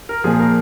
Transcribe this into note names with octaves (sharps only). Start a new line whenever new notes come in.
A#4
A#2 F3 G#4
A#4